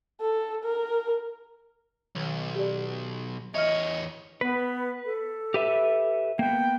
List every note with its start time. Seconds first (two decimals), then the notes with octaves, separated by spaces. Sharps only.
0.21 A4
0.64 A#4
2.15 B1 D#3
2.55 G4 D5
3.55 E2 C#5 D#5 E5 F6
4.41 B3 B4
5.05 A4
5.54 G4 B4 E5
6.39 A#3 B3 G5